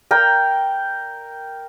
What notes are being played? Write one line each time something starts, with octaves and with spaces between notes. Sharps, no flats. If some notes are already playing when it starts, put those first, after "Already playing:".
A#4 G5